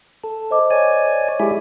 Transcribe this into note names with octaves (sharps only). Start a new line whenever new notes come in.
A4
C5 D#5 D6
C#5 D5 G#5
G#3 E4 G4 G#4 E5 G#5